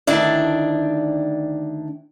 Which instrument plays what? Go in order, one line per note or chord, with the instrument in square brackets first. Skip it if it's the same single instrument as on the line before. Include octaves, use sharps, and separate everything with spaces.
[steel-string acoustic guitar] D2 D#3 D4 E4 D5